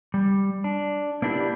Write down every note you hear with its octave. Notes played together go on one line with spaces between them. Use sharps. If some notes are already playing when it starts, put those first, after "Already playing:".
G3
D4
A#3 B3 D4 E4 G4